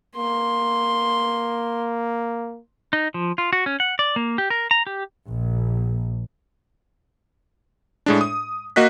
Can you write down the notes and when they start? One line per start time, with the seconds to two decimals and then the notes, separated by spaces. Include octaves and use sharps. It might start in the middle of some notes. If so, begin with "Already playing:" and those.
0.16 A#3 C6
2.93 D#4
3.14 F3
3.38 F4
3.53 F#4
3.66 C#4
3.80 F#5
3.99 D5
4.16 A#3
4.38 G4
4.50 A#4
4.71 A#5
4.87 G4
5.29 A#1
8.06 A2 G#3 D4
8.21 D#6
8.76 A#3 F#4 D#5 F#6 B6